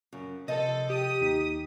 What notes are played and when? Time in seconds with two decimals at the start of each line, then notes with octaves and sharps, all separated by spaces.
0.13 F#2 C#3
0.48 C3 F3 A4 C5 D#5
0.90 G4 D#6
1.21 D#2 D#4 B6